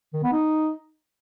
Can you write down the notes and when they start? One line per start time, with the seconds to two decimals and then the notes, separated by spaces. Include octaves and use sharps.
0.13 D#3
0.23 B3
0.32 D#4